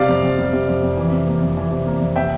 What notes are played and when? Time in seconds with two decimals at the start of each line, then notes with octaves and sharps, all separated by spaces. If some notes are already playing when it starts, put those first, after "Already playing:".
Already playing: C3 G3 D5 F5
0.08 F2
0.22 F2
0.38 G3
0.53 C3
0.68 F2
0.82 F2
0.97 E3
1.12 C3
1.27 A#3
1.42 F2
1.57 E3
1.71 C3
1.86 A#3
2.01 F2
2.16 C3 E5 G5